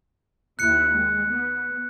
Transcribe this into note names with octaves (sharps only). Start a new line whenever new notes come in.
D#2 E4 F#6 C#7
G#3
B3